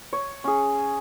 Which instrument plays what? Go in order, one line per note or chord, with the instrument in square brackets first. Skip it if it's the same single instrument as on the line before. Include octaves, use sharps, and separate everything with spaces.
[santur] C#5
C#4 G#4